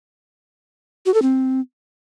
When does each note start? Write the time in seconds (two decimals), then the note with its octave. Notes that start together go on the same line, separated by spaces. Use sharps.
1.06 F#4
1.14 A4
1.22 C4